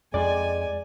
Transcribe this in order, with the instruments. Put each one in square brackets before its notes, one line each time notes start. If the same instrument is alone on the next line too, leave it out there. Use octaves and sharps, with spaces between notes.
[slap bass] F2 [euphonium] G#3 [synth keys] D5 [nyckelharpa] G#5